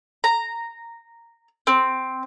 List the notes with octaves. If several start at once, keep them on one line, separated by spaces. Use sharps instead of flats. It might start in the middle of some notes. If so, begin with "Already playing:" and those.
A#5
C4